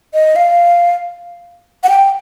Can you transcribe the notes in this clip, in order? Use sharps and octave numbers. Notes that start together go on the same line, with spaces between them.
D#5
F5
F#5
G5